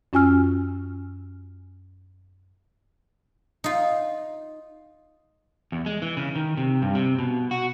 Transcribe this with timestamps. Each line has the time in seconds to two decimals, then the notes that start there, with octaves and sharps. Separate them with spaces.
0.13 F#2 C#4 F4 G#5 E6 F6
3.64 D#4 F4
5.72 E2
5.86 G#3
6.02 E3
6.17 C#3
6.35 D#3
6.57 C3
6.82 G2
6.95 C3
7.19 B2
7.51 F#4